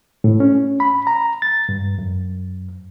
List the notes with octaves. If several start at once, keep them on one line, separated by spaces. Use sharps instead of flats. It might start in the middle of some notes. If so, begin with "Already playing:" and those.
A2
C#4
B5
A#5
A6
G2
F#2